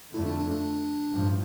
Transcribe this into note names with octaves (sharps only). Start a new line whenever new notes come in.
F2 D3 A3 E4
D4
D4
D4
A1 G2 F3